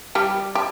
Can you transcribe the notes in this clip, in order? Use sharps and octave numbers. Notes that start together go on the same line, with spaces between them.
G3 G4
G4